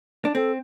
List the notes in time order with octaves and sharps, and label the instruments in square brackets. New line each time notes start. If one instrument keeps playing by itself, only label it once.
[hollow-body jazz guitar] D4
[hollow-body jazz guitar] C4 [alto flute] A4